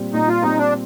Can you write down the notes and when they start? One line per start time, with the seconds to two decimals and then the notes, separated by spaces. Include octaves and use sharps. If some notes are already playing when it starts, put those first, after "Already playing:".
Already playing: A#2 G3 C4
0.13 A#2 D#4
0.28 F4
0.43 G3 C4 D#4
0.58 D4